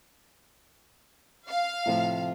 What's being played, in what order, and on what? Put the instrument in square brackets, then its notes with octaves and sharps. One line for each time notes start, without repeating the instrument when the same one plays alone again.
[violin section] F5
[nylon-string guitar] A2 C3 F3